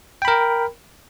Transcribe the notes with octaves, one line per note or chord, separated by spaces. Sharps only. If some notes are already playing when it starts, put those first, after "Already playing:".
A#4 G5 B5